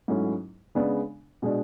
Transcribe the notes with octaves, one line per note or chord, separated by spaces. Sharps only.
G#2 F#3 A3 C#4 E4
C#3 G#3 B3 D4
B2 G#3 D4